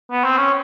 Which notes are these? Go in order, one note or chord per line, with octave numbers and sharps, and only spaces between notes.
B3
C4
C#4